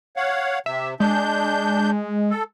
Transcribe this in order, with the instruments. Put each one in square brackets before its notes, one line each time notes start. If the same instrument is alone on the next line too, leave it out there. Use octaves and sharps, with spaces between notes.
[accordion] C#5 F5 F#5
[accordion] C3 [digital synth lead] E5
[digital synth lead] G#3 [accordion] D4 G6
[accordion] A4